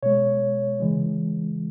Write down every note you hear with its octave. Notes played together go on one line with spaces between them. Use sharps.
B2 G#3 C#5
C#3 E3 G#3